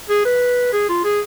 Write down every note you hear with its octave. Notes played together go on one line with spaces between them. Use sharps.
G#4
B4
G#4
F4
G#4